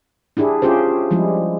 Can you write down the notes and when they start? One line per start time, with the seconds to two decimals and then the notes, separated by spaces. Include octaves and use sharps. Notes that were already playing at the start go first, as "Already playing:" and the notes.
0.37 D4 E4 G4 G#4
0.62 C#4 F4 G4 G#4 C5
1.11 F3 G3 G#3 E4